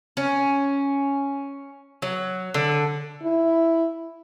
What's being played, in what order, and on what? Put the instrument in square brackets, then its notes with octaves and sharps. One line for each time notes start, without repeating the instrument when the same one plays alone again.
[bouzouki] C#4
F#3
D3
[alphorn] E4